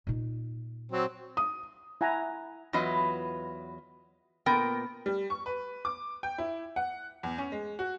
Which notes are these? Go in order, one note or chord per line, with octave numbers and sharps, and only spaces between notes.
A#2 D#4
F#3 C4
D#6
E4 F#5 G#5 A#5
E2 F#3 F4 B4 D#5
A#2 B3 A#4 G5
G3
C#6
B4
D6
G5
E4
F#5
E2
C#4
G#3
F#4